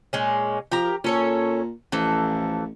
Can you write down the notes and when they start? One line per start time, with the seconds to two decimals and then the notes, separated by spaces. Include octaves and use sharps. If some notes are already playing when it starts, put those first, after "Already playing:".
0.13 A#2 G#3 C#4
0.71 F3 G4 A#4 A#5
1.04 A#2 C#4 A4 C#5
1.92 A1 E3 F3 A4